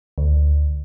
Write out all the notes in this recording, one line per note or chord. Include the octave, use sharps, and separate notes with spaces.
D2